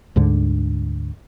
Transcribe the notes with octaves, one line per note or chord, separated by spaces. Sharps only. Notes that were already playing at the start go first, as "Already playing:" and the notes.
D2 G#2 D3